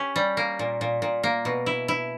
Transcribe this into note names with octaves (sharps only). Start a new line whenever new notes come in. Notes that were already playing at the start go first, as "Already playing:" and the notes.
Already playing: C#4 G4
G3
A#3
A#2
A#2
A#2
A#3
B2
E4
E4